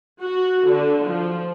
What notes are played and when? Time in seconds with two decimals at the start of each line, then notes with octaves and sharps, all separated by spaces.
0.21 F#4
0.68 D3
1.06 F3